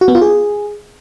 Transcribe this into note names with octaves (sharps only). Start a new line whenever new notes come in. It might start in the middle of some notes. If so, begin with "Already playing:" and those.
F#4
B3
F4
G#4